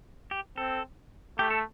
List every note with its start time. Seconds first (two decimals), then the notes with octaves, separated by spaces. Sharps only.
0.31 G4
0.57 C4 A4
1.39 A3 G4
1.50 A4